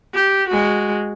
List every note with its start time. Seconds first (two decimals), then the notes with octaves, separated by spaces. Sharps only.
0.14 G4
0.48 G#3 F#4